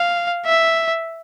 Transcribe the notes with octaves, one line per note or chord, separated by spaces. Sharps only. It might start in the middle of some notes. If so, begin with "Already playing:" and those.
Already playing: F5
E5